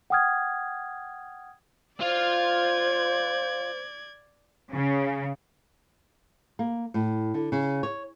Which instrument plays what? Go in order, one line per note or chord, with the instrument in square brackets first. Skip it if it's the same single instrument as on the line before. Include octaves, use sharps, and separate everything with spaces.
[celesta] F#5 G5 D#6 F6 G#6
[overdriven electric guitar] F4 F5 [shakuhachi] C5 [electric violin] D5 G#6
[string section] C#3
[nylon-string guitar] A#3
A2
D3
C#3
C#5